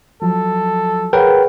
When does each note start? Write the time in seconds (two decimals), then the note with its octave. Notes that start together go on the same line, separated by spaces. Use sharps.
0.22 F3 F#3 A4
1.13 G#4 A#4 B4 C#5 F#5 G5